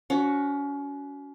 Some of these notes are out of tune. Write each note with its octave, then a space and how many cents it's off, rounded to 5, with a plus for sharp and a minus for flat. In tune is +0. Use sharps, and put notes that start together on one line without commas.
C#4 +30 F#4 +0